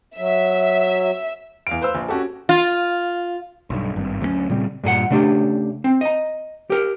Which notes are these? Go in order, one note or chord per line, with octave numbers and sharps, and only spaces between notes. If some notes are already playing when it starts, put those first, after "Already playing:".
F#3 E5
E2 F5 D7
B4 C5 F5 E6
A#1
C#4 F#4 G4 A4
F4
B1 G2
G#1 G2
D2 F#3 A3 C#4
A#2 C#3 G3 C4
G2 A#2 G#4 F#5
C#3 A3 D4 G4
C4
D#5 A#5
G4 A#4